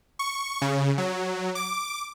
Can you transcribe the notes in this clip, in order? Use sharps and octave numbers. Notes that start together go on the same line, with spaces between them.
C#6
C#3
F#3
D6